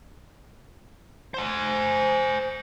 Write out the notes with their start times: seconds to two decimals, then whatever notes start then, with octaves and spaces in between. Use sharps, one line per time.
1.34 C5 G#5